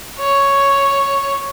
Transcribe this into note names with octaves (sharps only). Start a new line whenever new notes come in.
C#5